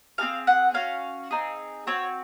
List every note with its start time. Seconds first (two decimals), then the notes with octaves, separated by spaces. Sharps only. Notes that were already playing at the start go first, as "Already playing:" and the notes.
0.18 C4 F4 G#4 F5
0.47 F#5
0.74 C#4 F#4 F5
1.31 C4 D#4 G#4
1.87 C4 F#4 C#5